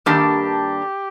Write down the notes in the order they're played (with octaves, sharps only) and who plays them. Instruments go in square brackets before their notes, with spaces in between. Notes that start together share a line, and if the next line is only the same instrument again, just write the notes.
[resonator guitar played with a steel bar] G2 D#3 A#3 D4 A4 [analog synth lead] G4